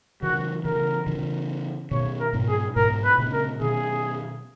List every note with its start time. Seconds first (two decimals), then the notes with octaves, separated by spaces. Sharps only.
0.22 C#3 E3 F#4
0.64 C#3 E3 A#4
1.07 C#3 E3
1.91 B2 D#3 C#5
2.20 A#4
2.33 G#2 B2
2.48 G#4
2.76 G#2 B2 A#4
3.04 B4
3.18 A#2 C#3
3.32 A#4
3.60 B2 D#3 G#4